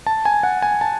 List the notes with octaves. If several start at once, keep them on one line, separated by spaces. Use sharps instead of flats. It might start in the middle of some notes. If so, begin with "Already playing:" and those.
A5
G#5
F#5
G#5
A5